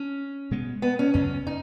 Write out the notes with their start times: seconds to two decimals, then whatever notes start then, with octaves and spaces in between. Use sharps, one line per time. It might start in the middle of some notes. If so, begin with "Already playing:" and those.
Already playing: C#4
0.51 B2 G#3 B3
0.82 B3
0.99 C#4
1.14 F#2 C#3 F#3 C#4
1.47 D#4